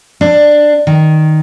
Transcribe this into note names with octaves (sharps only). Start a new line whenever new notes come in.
D4
D#3